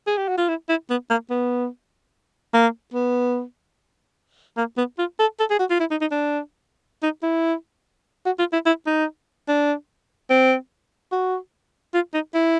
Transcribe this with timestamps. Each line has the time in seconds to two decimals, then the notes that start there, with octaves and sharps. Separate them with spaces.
0.07 G#4
0.18 G4
0.28 F#4
0.38 F4
0.49 E4
0.69 E4
0.90 B3
1.10 A#3
1.30 B3
2.54 A#3
2.94 B3
4.57 A#3
4.77 B3
4.98 F4
5.19 A4
5.40 A4
5.50 G#4
5.59 F#4
5.70 F4
5.80 E4
5.91 D#4
6.01 D#4
6.11 D4
7.03 D#4
7.23 E4
8.26 F#4
8.39 F4
8.53 E4
8.66 E4
8.87 D#4
9.48 D4
10.30 C4
11.12 F#4
11.94 F4
12.14 D#4
12.34 E4